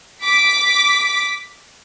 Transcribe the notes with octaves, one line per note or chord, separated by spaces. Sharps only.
D6 B6